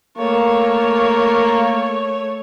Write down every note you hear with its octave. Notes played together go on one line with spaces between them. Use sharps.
A3 A#3 C#5